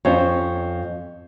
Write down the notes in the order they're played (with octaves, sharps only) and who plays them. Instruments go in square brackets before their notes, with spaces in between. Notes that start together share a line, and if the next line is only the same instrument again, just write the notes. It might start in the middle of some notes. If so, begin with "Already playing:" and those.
[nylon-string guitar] F2 [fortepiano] C#4 C5 C#5